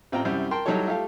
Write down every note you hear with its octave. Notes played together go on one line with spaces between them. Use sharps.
A1 C4 F4 G5 A#5
F#2 C3 G3 C4 E4
A#4 G5 A5 C6
F#3 G3 D#4 E4 A4 C#5
A3 F4 G4 A4 F5